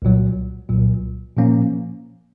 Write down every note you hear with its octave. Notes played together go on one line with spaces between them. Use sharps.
C2 A#2 F#3
C2 A#2 F#3
A#2 F3 A#3 C#4